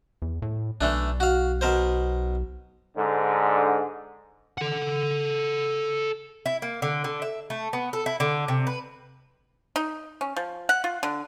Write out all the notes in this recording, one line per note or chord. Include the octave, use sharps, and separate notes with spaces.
E2
A2
B1 E3 A3 D4
F#4 F5
B2 A#4 C5
G#2 D3
A4 F#5
E4
A#3
D3
D3
E5
A3
B3
A4
E4
D3
C3
B4
D#4
C#4
F3
F#5
F4
D3